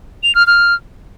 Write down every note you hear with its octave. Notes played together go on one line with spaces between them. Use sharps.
F7
F6
F6